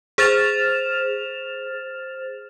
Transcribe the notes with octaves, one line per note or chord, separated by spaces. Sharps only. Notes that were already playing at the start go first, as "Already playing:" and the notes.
G#4 C5 F6 A6 E7 F7